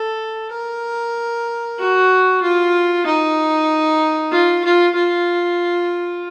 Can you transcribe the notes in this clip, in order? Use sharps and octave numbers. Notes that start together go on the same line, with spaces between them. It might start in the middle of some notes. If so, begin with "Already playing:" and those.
Already playing: A4
A#4
F#4
F4
D#4
F4
F4
F4